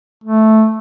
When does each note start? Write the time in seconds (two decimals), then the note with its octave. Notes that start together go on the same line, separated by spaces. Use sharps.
0.24 A3